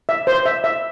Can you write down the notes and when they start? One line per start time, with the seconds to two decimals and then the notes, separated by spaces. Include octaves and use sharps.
0.09 E5
0.27 C5
0.46 E5
0.64 E5